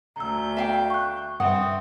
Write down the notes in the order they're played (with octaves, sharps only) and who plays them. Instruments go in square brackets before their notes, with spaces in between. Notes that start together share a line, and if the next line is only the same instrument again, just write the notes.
[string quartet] D2 G6 [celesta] A#5 E6
[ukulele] E5 F5 G5
[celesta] C#6 F#6
[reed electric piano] G2 [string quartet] C4 [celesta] E5 D#6 [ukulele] F#5